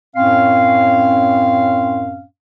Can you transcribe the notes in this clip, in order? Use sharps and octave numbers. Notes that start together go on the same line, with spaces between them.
F#2 A2 C4 C#4 F5